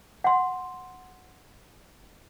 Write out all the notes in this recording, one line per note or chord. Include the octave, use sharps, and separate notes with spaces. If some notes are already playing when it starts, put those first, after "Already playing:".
F#5 C6